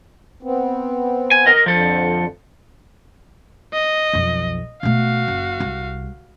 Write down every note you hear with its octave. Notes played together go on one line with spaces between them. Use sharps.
B3 C4
G#5
A#4 D#5
F2 D3 F3 A4
D#5
B1 F2
B2 A3 F#4 F5
F#1
C2